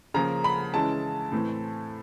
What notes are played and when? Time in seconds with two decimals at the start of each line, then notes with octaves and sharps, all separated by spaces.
0.14 C#3 F3 A#3 C#4 A#5
0.44 B5
0.74 C#3 E3 G#3 C#4 E4 A5
1.32 A2 E3 A3 C4